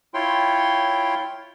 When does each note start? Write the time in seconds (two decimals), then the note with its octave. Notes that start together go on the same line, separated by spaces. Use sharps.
0.14 E4 F4 C#5 G5 C6